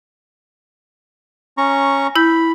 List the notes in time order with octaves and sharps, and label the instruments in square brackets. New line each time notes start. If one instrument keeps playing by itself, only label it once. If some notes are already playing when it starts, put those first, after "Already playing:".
[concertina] C#4 A#5 C#6
[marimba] E4 G6 [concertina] B5